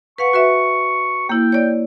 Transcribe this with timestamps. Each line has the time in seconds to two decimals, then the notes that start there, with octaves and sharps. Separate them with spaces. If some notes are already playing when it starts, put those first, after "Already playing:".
0.18 B4 F5 F#5 C#6
0.33 F#4 B4 E5
1.29 A#3 E4 G5
1.52 C#5 D5